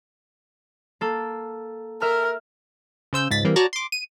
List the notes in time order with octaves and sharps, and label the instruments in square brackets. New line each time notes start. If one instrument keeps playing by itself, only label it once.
[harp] A#3 A4
[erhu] A#4 [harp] E5 F6
[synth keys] C#3 C5 E6 G6
C#2 G#2 A6 B6
E3 G3 A#3 C4
F#4 C#5 D5 A5 A#5
C6 D6
D#7